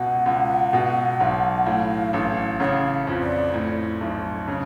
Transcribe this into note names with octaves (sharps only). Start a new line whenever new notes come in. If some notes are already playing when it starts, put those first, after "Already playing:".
Already playing: C#2 B2 F#5
C#2
B2
B1
A2 F5
A1
C#3 F5 F#5
F2
D5
A2
B1
C#3